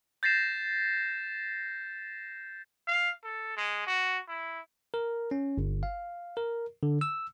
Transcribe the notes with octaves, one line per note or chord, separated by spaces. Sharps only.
G6 A6 A#6 C7 E7
F5
A4
G#3
F#4
E4
A#4
C#4
G1
F5
A#4
D3
E6